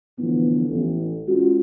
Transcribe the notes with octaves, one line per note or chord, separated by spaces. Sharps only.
A2 D3 E3 F3 B3
A1
G#3 C#4 F4 F#4